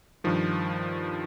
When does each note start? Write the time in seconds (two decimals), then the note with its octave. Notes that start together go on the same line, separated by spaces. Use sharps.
0.24 G2 D#3 F3